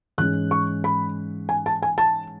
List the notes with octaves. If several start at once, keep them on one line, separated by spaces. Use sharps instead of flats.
G#2 E3 G#3 C#4 F#6
C#6
B5
G#5
A5
G#5
A5